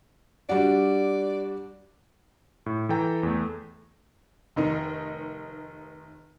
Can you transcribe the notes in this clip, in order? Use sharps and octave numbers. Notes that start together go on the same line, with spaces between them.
G3 D4 F#4 D5
A2
E3 A4 G5 A#5
E2 A3
F1 D#3 D#4 A#4